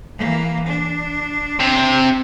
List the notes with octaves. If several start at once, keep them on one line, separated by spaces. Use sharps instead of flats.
E3 A#3
D4
C3